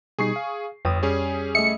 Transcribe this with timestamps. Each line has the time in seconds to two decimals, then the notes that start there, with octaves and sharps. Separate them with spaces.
0.19 B2 G3 D#4 G#4 C#6 C7
0.36 F5
0.85 G1 F2 B4 C#5 G5 D#6
1.03 G3 C#4 G#4 C#5
1.55 A3 D#5 E5 C#7